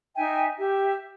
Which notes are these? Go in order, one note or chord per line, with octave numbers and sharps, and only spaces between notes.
D#4 E5 G5 G#5
G4 E5